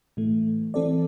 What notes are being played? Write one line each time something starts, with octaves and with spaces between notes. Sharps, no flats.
A2 E3 A3
E3 C4 A4 D5